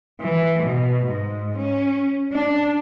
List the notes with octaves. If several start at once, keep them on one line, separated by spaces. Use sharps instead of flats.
E3
B2
G#2
C#4
D4